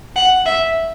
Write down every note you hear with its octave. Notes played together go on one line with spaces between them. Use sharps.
F#5
E5